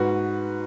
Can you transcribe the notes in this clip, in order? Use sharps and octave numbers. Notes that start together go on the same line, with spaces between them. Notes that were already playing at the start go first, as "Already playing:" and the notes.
Already playing: G#2 F#4 B4